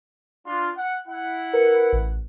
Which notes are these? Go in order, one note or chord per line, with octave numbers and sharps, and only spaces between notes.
D4 F4
F#5
E4 F#5
A#4 B4 C#7
A1